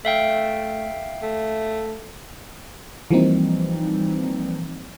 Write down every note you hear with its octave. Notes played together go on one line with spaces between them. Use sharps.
A3 E5 F5 G5
A3
E3 F3 G3 A#3 C4 D#4